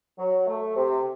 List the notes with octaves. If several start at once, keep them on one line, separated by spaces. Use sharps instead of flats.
F#3
A3
C3